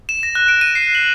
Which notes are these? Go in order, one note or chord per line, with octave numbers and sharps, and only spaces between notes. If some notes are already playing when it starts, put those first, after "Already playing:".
E7
A#6
F#6
D7
D#7
C7
F#7